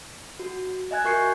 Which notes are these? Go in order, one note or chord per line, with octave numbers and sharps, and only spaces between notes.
F#4
D#5 E5 G#5 F#6 G#6
F#4 A#4 C#6 G6 C7 C#7